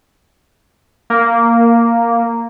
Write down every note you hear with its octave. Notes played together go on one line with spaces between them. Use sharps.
A#3